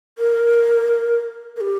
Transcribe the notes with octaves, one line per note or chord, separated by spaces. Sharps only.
A#4
A#4
G4